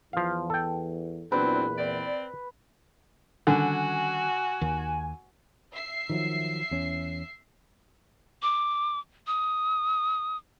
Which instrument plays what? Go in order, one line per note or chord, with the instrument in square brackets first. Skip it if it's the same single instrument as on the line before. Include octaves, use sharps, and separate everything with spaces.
[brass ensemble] E2 [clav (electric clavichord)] F3 F5
[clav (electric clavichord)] A4 G5
[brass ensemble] E2 A#2 [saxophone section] F#3 C4 D4 [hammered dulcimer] B4
[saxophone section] C4 D5
[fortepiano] D3 [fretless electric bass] D#3 G3 C#4 [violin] F#4 [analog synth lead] G#5
[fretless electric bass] D#2 D#3
[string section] E5 C7
[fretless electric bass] D#3 F3 F#3
E2 C#4
[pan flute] D6
D#6